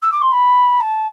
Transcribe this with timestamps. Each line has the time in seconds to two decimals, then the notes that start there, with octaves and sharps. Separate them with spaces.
0.02 E6
0.12 D6
0.21 C6
0.31 B5
0.80 A5